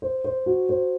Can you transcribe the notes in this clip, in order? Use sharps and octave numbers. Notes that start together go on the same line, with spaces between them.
C5
C5
F#4
C5